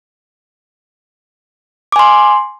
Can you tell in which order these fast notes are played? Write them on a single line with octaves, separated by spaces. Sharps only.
D6 G#5 C6